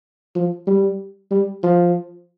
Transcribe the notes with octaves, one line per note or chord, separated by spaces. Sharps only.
F3
G3
G3
F3